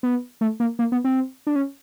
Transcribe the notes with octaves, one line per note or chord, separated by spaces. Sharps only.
B3
A3
A#3
A#3
B3
C4
D4
C#4